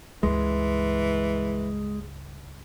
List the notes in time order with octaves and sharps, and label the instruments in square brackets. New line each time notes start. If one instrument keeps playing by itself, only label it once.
[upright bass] C#2 G2 [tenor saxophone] E3 [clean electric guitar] G#3